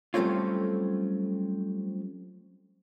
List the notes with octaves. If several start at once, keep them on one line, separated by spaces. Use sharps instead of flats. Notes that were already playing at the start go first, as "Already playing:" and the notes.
F#3 G3 A3 C4 C#4 F4